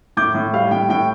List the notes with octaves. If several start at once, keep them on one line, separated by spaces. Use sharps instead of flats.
A2 D6 G6
A2
G3 F5
A2 G5
A2 G5